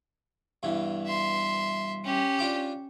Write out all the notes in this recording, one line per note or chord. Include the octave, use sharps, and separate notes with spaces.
G2 B2 E3
E5 C6
C#4 G4
D4 F4 D6